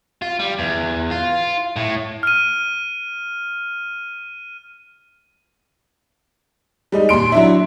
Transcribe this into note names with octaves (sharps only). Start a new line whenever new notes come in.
F4
G3
E2
F4
A2
F6 D#7
G3 G#3 D#4
D#2 A#2 C6 D7
F#3 D4 E4